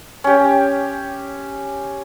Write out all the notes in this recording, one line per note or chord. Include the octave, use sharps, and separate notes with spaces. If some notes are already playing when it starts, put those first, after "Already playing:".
C#4 G4